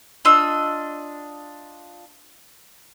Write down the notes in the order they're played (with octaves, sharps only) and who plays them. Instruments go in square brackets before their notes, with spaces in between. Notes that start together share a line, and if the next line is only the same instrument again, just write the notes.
[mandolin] D4 F4 D#5 E6